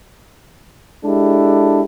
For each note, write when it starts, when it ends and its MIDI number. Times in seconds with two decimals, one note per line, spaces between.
1.04 1.82 56
1.04 1.82 62
1.04 1.82 64
1.04 1.82 67
1.04 1.82 69